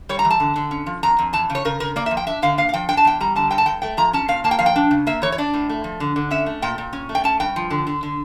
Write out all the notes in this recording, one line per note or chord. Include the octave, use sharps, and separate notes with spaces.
G3 C#5
A#5
E3
A5
D3
D3
C#4
F3
F2 A#5
F2
E3 A5
C#3
C#5
C#3 A#4
C#3 A#4
A#3 D5
E5
F3
G5
D4 E5
D3 F5
A#3 F5
F5
F3 G5
D4 G5
A5
E2 G5
G3 A#5
D3 A5
G2 G5
A5
G2 G5
A3 G5
F3 A#5
C#4 A5
A#2 F5
A#3 A5
G5
F3 F5
G5
D4
C#3
A#3 E5
E3 C#5
C#5
D4 D5
A2
A3
F3
D3
D3
C#4 E5
A3
A#2 G5
A#2
C#4
A3
G5
C#4 A5
G2 G5
F3
D3
D3
D3